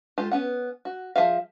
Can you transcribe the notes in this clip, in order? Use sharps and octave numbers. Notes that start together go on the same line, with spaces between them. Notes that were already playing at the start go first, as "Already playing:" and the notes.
G#3 F4 G4 A4
B3 C#4 F#5
F#4
F3 G#4 E5 F5